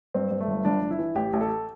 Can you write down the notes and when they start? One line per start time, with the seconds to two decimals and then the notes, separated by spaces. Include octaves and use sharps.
0.14 G2 C4
0.31 G2
0.41 A3
0.48 G1
0.65 G1 D4
0.82 G1
0.91 E4
0.99 E3
1.15 A1 G4
1.33 A1
1.41 A4